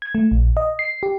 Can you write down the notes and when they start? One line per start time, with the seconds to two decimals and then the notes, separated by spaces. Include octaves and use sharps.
0.02 G#6
0.15 A3
0.31 A#1
0.57 D#5
0.79 C7
1.03 G4